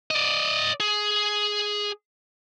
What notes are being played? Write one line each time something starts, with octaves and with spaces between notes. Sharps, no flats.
D5 D#5
G#4